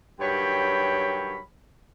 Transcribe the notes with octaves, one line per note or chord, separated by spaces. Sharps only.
G2 D#3 F#3 C#5 G5 B5